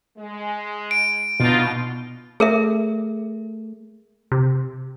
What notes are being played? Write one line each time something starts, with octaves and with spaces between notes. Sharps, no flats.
G#3
D7
B2 B3 D4 D#4 F4
A3 G#4 A#4 E5
C3